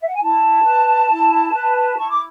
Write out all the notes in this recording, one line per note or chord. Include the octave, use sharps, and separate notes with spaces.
E5
F#5
G#5
E4 A5
B4
E4
B4
E4 C#6
D6